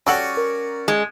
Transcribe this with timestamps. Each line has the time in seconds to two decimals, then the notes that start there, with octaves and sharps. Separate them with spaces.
0.07 G3 C#4 F#4 A4 D5 F#5
0.37 A#4
0.88 G#3